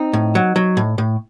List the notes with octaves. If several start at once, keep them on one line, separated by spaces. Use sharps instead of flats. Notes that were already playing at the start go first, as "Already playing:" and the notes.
Already playing: C4 D#4
A2
F#3
F#3
A2
A2